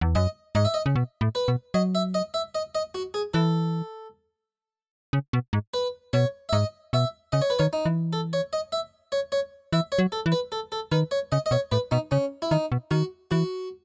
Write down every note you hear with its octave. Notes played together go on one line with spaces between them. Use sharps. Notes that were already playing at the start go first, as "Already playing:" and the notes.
E2
F#2 D#5
G#2 D#5
E5
D#5
C#3
B2
A2
B4
B2
F#3 D#5
E5
D#5
E5
D#5
D#5
F#4
G#4
E3 A4
C#3
B2
G#2
B4
B2 C#5
E5
G#2 D#5
B2 E5
C#3 D#5
C#5
B4
D#3 C#5
D#4
E3
A4
C#5
D#5
E5
C#5
C#5
E3 E5
C#5
F#3
A4
E3
B4
A4
A4
D#3 B4
C#5
C#3 D#5
D#5
B2 C#5
A2 B4
B2 D#4
C#3 C#4
E4
D#3 D#4
B2
D#3 F#4
E3 F#4